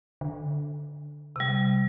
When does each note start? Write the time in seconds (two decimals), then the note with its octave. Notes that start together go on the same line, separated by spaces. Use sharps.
0.21 D3
1.36 C3 G3